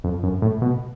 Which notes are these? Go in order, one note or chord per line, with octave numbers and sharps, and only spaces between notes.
F2
F#2
A2
B2